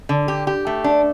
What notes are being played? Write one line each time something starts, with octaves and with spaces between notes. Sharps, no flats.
D3
G4
G4
A3
D4